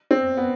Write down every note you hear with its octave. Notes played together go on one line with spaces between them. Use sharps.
C4
B3